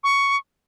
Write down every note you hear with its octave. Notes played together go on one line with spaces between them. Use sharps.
C#6